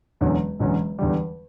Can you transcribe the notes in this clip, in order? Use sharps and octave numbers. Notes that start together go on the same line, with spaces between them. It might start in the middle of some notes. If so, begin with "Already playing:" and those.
E1 E2 D3 F#3 C#4
E1 E2 D3 F#3 C#4
E2 D3 G3